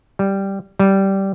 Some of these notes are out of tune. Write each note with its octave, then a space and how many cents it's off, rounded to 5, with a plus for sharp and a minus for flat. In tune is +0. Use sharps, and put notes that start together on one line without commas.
G3 +0
G3 -10